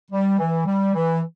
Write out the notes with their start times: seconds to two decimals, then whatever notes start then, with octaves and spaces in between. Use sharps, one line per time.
0.11 G3
0.39 E3
0.66 G3
0.94 E3